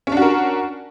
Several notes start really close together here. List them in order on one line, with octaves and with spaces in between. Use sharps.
C#4 D4 F#4 A#4